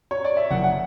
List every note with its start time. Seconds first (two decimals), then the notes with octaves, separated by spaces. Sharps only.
0.11 C#5
0.24 D5
0.37 E5
0.51 F#1 F#5
0.64 F#5